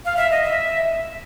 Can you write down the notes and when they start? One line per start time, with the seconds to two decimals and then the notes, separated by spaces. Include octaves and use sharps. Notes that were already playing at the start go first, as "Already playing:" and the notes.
0.05 F5
0.17 E5
0.31 D#5
0.44 E5